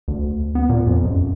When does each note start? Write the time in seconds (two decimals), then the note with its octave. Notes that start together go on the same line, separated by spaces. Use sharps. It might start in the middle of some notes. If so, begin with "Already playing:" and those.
0.08 D2
0.55 B3
0.69 A#2
0.87 F2
1.05 F#2